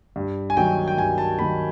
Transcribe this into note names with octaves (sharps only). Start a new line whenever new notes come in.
G2
G#5
D#3 F#3 A#3 G5
G5
G2 G#5
A5
D#3 F#3 A#3 B5